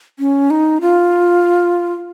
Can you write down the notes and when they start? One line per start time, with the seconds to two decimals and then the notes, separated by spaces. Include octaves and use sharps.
0.19 C#4
0.50 D#4
0.81 F4